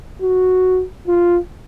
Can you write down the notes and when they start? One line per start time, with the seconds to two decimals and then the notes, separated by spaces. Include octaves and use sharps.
0.22 F#4
1.07 F4